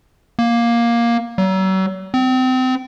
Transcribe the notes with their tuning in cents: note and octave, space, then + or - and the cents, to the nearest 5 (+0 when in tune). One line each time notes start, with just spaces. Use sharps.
A#3 +10
F#3 +40
C4 -30